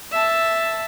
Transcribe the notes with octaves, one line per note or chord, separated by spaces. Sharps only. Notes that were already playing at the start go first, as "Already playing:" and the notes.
E5 A5